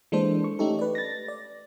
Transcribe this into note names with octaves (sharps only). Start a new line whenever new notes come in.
E3 G#3 A#3 D4 A4 C5
C#6
A3 C#4 D#4 G4 A4
B4 D5
A6 A#6
D5